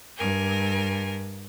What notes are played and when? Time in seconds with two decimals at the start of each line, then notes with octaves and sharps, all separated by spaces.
0.18 G2 A#4 G#5